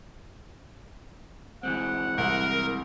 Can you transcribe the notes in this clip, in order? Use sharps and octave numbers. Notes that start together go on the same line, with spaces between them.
E3 G#3 C4 F#5
C2 A#4